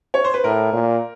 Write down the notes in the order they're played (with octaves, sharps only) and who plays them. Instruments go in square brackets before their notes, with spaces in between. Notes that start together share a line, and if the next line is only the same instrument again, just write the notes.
[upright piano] C#5
C5
B4
[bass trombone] A2 [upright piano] A#4
[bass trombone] A#2